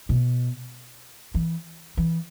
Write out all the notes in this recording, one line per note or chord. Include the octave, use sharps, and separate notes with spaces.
B2
E3
E3